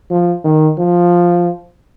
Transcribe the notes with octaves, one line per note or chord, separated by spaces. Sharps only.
F3
D#3
F3